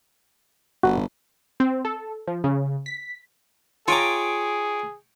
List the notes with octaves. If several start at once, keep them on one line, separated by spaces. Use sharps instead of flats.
G1 F#4
C4
A4
F3
C#3
B6
F4 G#4 C#5 G5 A#5 D6